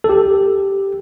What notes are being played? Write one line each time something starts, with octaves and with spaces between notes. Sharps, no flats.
A4
G4